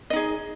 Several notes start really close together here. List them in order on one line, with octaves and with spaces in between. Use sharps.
D#5 D#4 G#4